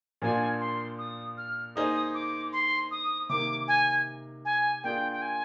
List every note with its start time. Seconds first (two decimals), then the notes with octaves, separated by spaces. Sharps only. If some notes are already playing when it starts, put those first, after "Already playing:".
0.22 A#2 F3 A#3 D4 F4 G#5
0.60 C6
0.99 D#6
1.37 F6
1.76 A#3 D#4 G#4 C5 D#6
2.14 D6
2.53 C6
2.91 D#6
3.29 C3 D#3 A#3 D6
3.68 G#5
4.45 G#5
4.84 A#3 D4 F4 G#4 G5
5.12 G5
5.22 G#5